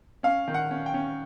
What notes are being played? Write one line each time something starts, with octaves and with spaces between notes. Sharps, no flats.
C#4 F5
D#3
F#5
C#4
G5
C#4